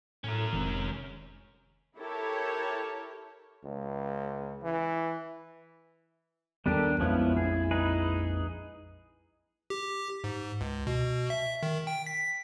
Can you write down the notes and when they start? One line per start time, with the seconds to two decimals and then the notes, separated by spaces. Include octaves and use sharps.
0.24 A2 C#4 A#4
0.53 F1 D#3 G#3 C4
1.98 E4 G4 A4 A#4 C#5
3.64 C#2
4.63 E3
6.66 D#2 G3 B3 D4 G4 A4 A#4
7.00 A#1 F2 F3 G#3 B3 C#4 E4
7.37 G#4
7.71 D#4 G#4 B4
9.70 G4
10.24 G#2
10.61 C#2
10.87 B2
11.30 E5
11.63 D#3
11.87 G5
12.07 B6